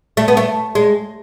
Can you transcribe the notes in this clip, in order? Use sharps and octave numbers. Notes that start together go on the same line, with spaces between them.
A3
B3
A3
G#3